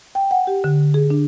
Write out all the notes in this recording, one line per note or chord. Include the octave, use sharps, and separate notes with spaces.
G5
F#5
G4
D3
G#4
D4